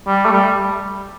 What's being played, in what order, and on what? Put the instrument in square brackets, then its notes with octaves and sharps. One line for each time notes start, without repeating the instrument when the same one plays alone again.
[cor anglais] G3
A3
G3